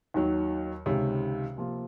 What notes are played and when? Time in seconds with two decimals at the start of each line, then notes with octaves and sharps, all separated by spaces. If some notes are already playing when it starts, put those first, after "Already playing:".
0.14 D#2 D#3 F#3
0.86 C#2 C3 D#3 G#3 C#4
1.57 C3 F3 A#3 F4